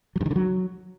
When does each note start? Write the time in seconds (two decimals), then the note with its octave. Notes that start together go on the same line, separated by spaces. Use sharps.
0.16 F#3
0.21 G2
0.26 D#3
0.31 D3
0.36 F#3